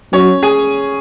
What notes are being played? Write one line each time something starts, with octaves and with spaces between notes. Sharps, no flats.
F#3 C#4 C#5
G#4 G#5